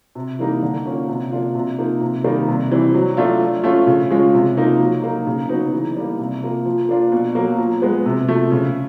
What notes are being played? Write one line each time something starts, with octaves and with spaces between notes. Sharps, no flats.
C3
E3 G3 A#3 D#4
D3
F3 A#3 C#4
C3
F3 A#3 D4 F4
C3
F3 A#3 D#4
C3
D#3 G3 A#3 D#4
C3
E3 G3 C4
F#3
A3 D4 F4
F3
A3 C#4 F4
C#3
F3 G#3 C#4 F4
C3
F3 A#3 D#4
F#3
A#3 D#4
C#3
F#3 B3 D#4
E3
G3 A#3
C3
F3 A#3
F3
A#3 D4 F4
B2
F#3 A#3
F3
G#3 B3
C3
F3 A3
C#3